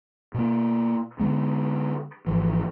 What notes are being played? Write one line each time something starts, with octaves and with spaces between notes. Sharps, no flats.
B2 A#3
D3 G#3 B3
G#1 E3 F3